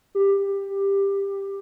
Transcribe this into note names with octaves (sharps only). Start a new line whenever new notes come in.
G4